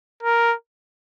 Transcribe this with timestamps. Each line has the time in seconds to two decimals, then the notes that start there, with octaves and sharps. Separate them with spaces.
0.23 A#4